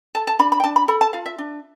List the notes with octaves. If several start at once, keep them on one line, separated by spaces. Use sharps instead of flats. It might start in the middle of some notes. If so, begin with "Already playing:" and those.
A4 A5
A5
D4 B5
B5
G5
D4 A5
B5
A4 B5
A5
F4 F5
E5
D4